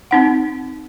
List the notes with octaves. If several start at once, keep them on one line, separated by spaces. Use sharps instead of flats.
C4 D#4 F#5